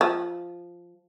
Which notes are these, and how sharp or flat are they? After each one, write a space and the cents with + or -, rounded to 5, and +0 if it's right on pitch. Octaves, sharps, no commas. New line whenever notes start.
F3 +0